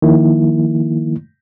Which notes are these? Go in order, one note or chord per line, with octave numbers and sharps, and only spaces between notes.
D#3 F3 A#3 E4